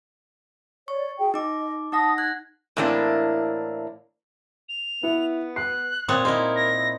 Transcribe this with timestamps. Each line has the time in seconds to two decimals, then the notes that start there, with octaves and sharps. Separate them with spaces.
0.88 C#5 D5 C#6
1.19 F#4 G#4 G5
1.34 D#4 D#5 D6
1.92 D#4 F#5 A5 D#6 A#6
2.18 F#6 G#6
2.77 A2 E3 A#3 C4 D4 E4
4.69 F7
5.03 B3 E4
5.56 F#6 C7
6.08 A#2 C4 C#5 D#6
6.25 D#4 E4 A#4 C6
6.56 A#6